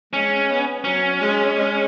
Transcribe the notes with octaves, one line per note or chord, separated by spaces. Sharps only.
G#3 C#4
B3
F#3 C#4
G#3
G#3